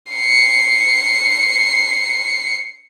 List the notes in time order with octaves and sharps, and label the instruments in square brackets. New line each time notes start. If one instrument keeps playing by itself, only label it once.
[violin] C7 C#7